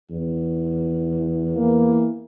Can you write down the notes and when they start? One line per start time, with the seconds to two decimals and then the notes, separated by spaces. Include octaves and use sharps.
0.11 E2
1.56 E3 A#3